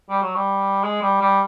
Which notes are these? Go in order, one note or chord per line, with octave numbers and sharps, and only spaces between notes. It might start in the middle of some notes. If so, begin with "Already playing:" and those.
G3
F#3
G3
G#3
G3
G3